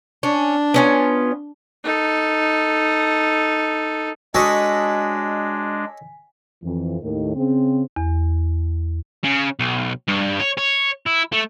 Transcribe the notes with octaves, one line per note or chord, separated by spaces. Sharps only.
C#4 D4
B3 C#4 F4
D#4 A4
G#3 D4 F#4 A4 C#5 D#5 G#5 B6
F2 E3
D#2 A2 D#3
C#3 C4
E2
C#3
B1
G2
C#5
C#5
E4
A3